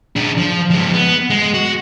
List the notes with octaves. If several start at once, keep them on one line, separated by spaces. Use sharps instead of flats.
D4 G#4
F3
F3 G#3
B3
G#3
F#4